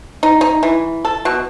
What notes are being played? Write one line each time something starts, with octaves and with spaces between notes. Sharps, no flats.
D#4
D#4
E3
A4
B2